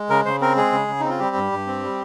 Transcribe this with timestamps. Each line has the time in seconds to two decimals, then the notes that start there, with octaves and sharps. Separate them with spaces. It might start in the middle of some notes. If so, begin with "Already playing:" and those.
Already playing: G#3
0.10 C#3 A#4
0.25 C#3 C5
0.41 C4 A#4
0.56 G#3 G#4
0.72 C#3
0.88 C#3
1.00 C4 D#4
1.10 F4
1.19 G3 G4
1.36 G2
1.52 G2
1.67 C4
1.83 G3